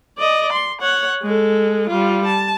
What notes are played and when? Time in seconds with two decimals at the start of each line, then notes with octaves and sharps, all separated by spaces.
0.18 D5 D#5
0.53 C6
0.81 C#5 F#5
1.23 G#3 A4
1.89 G3 F4
2.26 A5